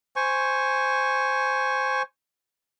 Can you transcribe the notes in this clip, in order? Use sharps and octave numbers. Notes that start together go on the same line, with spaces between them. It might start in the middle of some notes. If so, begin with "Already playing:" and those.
C5 G#5 C#6